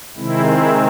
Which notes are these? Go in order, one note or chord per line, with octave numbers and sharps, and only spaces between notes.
C3 D#3 G#3 C4 E4
E4